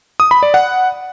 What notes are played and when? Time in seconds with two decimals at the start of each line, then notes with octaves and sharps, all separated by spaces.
0.20 D#6
0.31 B5
0.43 D5
0.54 F#5